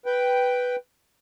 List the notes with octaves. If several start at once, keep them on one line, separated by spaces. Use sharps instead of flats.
B4 G5